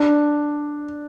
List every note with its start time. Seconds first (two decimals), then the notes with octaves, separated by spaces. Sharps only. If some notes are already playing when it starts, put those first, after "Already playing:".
Already playing: D4